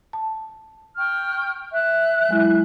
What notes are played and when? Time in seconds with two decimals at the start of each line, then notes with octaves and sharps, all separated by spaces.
0.13 A5
0.96 G5 C#6 F6
1.73 E5 F#6
2.29 F#3 G#3 E4